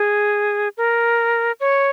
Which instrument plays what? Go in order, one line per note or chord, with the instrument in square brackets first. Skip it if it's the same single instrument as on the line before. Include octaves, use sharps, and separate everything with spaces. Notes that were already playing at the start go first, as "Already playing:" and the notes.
Already playing: [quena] G#4
A#4
C#5